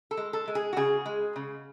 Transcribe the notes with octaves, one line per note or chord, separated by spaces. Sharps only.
A4
G#3
A4
G#3
G#4
F#4
C#3 G#4
G#3
C#3